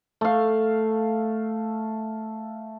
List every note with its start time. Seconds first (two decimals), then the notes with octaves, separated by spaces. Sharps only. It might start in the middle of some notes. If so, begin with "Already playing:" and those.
0.21 A3 F5